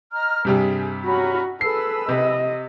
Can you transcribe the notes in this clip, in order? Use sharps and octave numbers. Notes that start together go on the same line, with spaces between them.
D#5 A#5 F6
G2 C3 G3 G#4
C#4 F#4 A#5 B5
G#4 A4 B4 E6 C7
C3 D#5